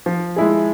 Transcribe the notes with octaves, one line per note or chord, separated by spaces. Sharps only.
F3
G#3 E4 G#4